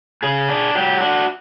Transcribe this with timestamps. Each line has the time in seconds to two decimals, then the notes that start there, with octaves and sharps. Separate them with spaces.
0.23 C#3 G#4
0.49 D4
0.75 F#3 G4
1.01 D4 F#4